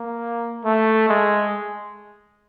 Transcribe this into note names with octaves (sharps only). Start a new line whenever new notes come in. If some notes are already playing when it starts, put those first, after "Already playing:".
Already playing: A#3
A3
G#3